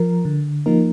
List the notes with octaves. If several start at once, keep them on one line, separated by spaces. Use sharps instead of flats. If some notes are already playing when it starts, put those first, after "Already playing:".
Already playing: F3 A#4
D3
F3 A#3 D#4 A#4